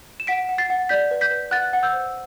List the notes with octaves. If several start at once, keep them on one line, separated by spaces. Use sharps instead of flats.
E7
F#5 B6 D7
F#5
A6 C7
F#5
D5 G6 B6
B4
G6 B6
B4
F#5 F#6 A6
F#5
E6 G6
C5